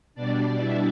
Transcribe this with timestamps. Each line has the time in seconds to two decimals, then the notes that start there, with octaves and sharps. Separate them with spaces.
0.15 B2 G3 D4 D5
0.57 E4 E5